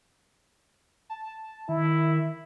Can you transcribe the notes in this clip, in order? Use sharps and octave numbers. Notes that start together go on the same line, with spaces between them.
A5
D#3 E4